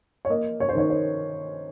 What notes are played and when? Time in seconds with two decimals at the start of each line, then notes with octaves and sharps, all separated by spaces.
0.25 C#5
0.30 A#3 D#5
0.60 C#5
0.69 C5
0.75 D#3 C#5
0.90 C5